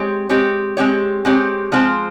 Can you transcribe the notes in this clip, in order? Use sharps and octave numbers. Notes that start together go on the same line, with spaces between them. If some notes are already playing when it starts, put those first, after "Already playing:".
Already playing: G#3 C4 G4 C#5
G#3 C4 G4 C#5
G#3 C4 G4 C#5
G#3 C4 G4 C#5
F3 G#3 C4 F4 C5